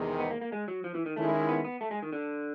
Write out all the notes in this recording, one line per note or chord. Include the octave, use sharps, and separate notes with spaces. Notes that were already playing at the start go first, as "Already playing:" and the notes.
Already playing: E2 C3 D#3 G#3
B3
A#3
A#3
G#3
F#3
F3
E3
D#3
D#3 G#3 A3 C#4 E4
B3
B3
A3
G#3
D#3
D3